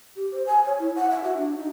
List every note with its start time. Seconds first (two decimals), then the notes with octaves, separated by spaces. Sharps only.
0.16 G4
0.32 C5
0.47 G#5
0.66 C#5
0.79 E4
0.96 F#5
1.10 E5
1.24 F#4
1.37 D4
1.57 D#4